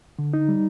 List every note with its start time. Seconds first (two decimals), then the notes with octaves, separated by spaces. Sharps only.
0.19 D3
0.33 D#4
0.49 G3